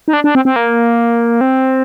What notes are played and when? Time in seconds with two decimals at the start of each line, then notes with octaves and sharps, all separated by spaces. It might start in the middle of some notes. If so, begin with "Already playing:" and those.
0.08 D#4
0.13 D4
0.24 D4
0.35 C4
0.45 C4
0.56 A#3
1.41 C4